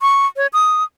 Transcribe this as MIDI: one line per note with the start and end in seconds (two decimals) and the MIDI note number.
0.02 0.26 85
0.37 0.47 73
0.53 0.84 87